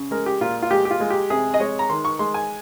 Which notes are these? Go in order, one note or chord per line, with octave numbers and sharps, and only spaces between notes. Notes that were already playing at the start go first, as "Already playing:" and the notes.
Already playing: C#3
G#3 A#4
G4
A#2 F4
F4
G#3 G4
G4
F4
G#3
G4
C3 G#4
D#5
G#3 C#5
A#5
D#3 C6
C#6
G#3 C6
G#5